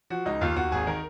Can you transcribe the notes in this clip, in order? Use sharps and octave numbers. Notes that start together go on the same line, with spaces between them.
F3 F#4
C#2 D#4
D#2 F4
D#2 F#4
G#1 G#4
D#3 A#4